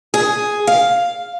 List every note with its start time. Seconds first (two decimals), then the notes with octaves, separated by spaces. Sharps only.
0.14 G#4
0.67 F5